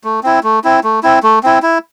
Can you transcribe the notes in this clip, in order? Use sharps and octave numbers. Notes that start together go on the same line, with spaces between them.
A3
C4 E4
A3
C4 E4
A3
C4 E4
A3
C4 E4
E4